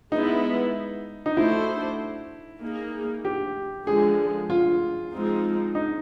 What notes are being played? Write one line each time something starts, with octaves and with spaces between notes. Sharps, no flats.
G#3 B3 D#4 E4
D#4
A3 D4 E4 F#4 A4 C5
A#3 D#4 G#4
G4
D3 F3 G#3 G#4
F4
F3 G#3 C4 D#4
D#4